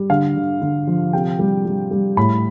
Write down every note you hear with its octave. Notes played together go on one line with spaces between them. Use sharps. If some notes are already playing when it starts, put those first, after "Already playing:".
Already playing: G3
D3 F5
D3
D3
F3
C3 G5
G3
G3
G3
A2 B5